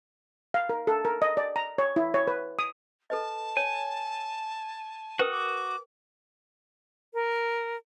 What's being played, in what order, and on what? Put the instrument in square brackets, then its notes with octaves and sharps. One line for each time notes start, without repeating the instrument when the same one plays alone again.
[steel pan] F5
A#4
A4
A#4
D#5
D5
A#5
C#5
E4
C#5
B4
D#6
[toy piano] A4 B4 D#5 [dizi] A5
[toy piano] C#5 [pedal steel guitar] G#5
[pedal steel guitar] F#4 D#6 [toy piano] A#4 B4 G5
[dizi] D6
[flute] A#4